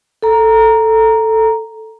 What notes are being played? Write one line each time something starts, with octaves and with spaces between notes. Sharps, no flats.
A4 A#5